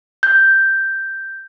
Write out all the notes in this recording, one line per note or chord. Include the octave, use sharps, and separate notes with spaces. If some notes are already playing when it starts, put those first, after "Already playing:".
G6